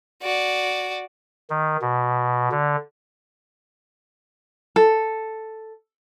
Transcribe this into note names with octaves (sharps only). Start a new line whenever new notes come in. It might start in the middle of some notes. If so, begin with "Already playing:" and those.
F#4 D5
D#3
B2
D3
A4